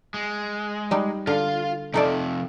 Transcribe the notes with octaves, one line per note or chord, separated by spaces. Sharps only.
G#3
G3 D#4
D3 F4 F5
C3 F3 D#4 A4 D5